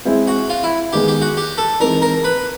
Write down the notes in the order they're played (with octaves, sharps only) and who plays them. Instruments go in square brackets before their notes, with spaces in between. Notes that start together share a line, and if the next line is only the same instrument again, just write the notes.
[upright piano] G#3 C4 E4
[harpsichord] F#4
F4
E4
[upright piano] D#3 G#3 B3 [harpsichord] G4
[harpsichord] G4
F#4
G4
A4
[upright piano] E3 G#3 C4 D#4 [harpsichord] A#4
[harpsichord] A#4
B4